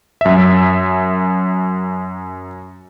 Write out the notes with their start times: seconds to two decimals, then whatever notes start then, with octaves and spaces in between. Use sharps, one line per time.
0.21 F#2 E5